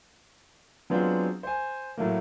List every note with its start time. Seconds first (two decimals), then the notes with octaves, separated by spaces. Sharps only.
0.90 F#3 G#3 B3 C4 D4 F4
1.43 C5 G#5
1.97 A2 F#3 A3 A#3